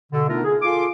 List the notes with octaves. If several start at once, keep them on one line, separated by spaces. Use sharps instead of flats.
B2 D3
A3 B3 D4 D#4 F4 A#4
G#4
F4 A4 G#5 C6 D6